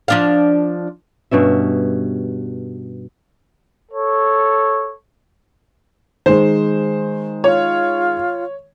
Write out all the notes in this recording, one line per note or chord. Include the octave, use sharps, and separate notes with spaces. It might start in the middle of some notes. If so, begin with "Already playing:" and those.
F3 D4 F5
G2 B2 C#4 E5
A4 C#5
D#3 G#3 C5
F4 C#5